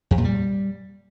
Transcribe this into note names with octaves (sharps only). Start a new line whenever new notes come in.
F2
A#2
G3